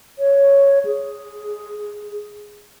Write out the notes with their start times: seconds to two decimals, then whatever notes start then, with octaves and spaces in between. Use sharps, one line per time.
0.19 C#5
0.85 G#4